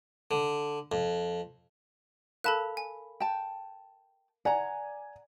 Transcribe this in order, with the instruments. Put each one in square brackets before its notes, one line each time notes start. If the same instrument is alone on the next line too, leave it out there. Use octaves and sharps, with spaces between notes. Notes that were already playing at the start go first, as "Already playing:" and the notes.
[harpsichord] D3
F2
[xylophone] A4 A5 F#6 [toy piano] A#4 F5 B5
[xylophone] G#5
[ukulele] G5 A5
[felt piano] D5 G#5 [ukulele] F#5 A#5